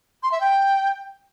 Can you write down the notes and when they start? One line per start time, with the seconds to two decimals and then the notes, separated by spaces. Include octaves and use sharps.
0.23 C6
0.32 E5
0.41 G5